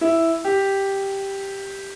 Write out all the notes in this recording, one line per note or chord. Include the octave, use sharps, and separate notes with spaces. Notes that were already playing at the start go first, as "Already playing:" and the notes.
E4
G4